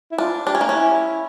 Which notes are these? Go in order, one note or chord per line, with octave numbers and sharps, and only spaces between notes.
E4
D4 F4
D4 G4
C#4
A#3
C#4
E4